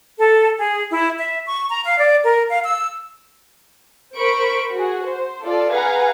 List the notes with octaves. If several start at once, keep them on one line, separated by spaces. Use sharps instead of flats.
A4
G#4
E4
E5
C#6
A#5
F5
D5
A#4
F5
E6
A#4 C5 B5 C#6 D7
F#4 G#4
C5
F4 A4 D5
G#4 B4 F5 F#5 G#5 A#5